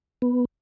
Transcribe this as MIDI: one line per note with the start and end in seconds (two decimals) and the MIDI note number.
0.22 0.45 59